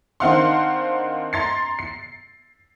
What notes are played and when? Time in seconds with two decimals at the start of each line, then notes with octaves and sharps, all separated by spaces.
0.20 D#3 C4 D4 F5 F#5 C6
1.33 A#5 C6 A6 C7
1.79 C7